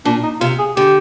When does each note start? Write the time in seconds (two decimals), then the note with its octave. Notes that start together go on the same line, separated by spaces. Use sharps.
0.05 A#2 D4
0.23 D#4
0.41 C3 F4
0.59 G#4
0.76 D3 G4